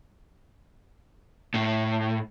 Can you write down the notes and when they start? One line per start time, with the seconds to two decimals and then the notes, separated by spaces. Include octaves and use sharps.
1.54 A2